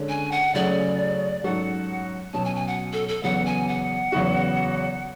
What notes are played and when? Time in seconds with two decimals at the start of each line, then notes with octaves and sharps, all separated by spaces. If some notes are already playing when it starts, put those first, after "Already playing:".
Already playing: D3 G#3 C#4
0.09 G#5
0.31 F#5
0.54 C#3 F#3 A3 C#4 G#4 D5
1.44 G#2 F#3 C#4 F#4 A4 F#5
2.33 B2 F#3 C#4 A5
2.45 G#5
2.56 G#5
2.67 F#5
2.93 A4
3.08 A4
3.23 E2 C#3 F#3 B3 F#5
3.46 G#5
3.68 F#5
4.12 E2 C#3 F#3 B3 F#4